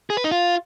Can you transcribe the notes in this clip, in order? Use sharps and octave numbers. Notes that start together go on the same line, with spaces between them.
G#4
B4
D#4
F4